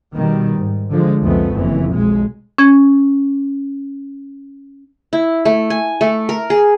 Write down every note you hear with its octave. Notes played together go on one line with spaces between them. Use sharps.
B2 D#3 G3
G#2
D3 F3 G#3
C2 F2 G#3 A3 B3
F#1 F2 E3
B1 G#3
C#4 G#6
E4
A3
G#5
A3
A#4
G#4